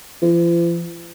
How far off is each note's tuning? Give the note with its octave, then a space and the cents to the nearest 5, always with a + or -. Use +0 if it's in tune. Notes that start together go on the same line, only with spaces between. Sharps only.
F3 -45